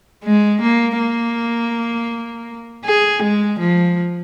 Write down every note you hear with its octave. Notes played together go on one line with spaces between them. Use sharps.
G#3
A#3
A#3
G#4
G#3
F3